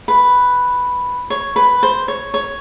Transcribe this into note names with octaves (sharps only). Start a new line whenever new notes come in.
B4
C#5
B4
C5
C#5
C#5